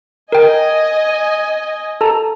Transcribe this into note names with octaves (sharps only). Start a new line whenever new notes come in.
A#4 D#5 G5 G#5
A4 A5 A#5